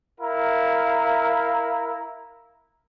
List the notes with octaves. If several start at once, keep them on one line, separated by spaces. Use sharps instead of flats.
E4 A#4 F5 A#5